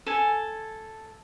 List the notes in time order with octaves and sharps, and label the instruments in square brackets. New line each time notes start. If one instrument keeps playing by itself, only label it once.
[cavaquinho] A4 G#5